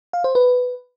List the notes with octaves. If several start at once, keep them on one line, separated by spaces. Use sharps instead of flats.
F5
C5
B4